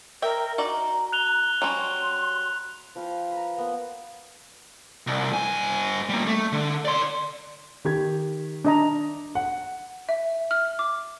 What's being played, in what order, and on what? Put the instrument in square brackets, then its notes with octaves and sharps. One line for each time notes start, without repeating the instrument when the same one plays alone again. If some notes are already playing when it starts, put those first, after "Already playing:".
[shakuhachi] A#4 [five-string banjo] E5 G5
[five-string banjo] D#4 F#4 D5 [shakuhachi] A#5
[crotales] F#6 F7 G7
[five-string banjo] F#3 G3 C#4 [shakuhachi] C6
[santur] F3 B4 F5 G5
A#5 B5
A#3 B3
[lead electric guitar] C2
G2 G#5
G3 A#3
A3
D3
D5 C6
[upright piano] D#3 G4 G#6
[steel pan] D4 D#5 A#5
[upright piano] F#5
[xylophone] E5
F6
D6